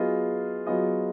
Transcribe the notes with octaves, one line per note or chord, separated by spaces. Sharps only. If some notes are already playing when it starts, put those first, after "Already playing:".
Already playing: F#3 B3 F4 G#4 D#5
F#3 B3 F4 G#4 D#5